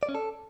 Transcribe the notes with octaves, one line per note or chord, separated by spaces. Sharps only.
D5
C#4
A4